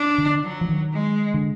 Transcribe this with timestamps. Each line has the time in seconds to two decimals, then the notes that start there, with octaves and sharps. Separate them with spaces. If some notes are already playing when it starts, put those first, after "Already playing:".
Already playing: D4
0.18 D3
0.44 F#3
0.61 F3
0.69 D#3
0.94 G#3
1.34 D3